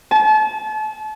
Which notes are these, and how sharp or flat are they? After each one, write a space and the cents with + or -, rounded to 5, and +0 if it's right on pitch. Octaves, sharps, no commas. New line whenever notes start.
A5 -35